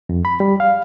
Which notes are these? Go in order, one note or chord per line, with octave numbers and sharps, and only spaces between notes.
F2
B5
G3
F5